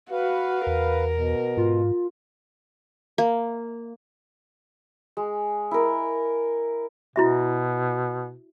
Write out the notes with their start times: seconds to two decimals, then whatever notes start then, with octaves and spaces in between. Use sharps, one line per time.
0.11 F#4 B4 F5
0.67 E2 A#4
1.13 B2
1.57 G#2 F4
3.18 A#3
5.17 G#3
5.71 E4 A#4
7.16 B2 E4 F#4 E5